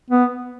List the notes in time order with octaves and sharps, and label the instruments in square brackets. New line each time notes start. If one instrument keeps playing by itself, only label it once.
[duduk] B3